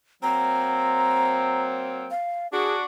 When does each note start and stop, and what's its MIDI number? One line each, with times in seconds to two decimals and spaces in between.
0.23 2.07 54
0.23 2.07 58
0.23 2.07 60
0.23 1.62 82
2.11 2.47 77
2.52 2.84 62
2.52 2.84 66
2.52 2.75 68